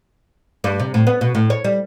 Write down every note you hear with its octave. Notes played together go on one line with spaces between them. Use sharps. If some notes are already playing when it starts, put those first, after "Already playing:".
G2
C3
A2
B3
B2
A2
C#5
G3